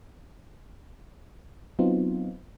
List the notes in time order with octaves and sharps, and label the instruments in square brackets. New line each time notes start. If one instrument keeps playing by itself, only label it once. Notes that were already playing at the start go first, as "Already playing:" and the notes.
[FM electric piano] F#3 B3 C4 D#4 F4